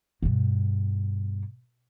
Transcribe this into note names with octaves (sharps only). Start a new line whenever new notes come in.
G2 B2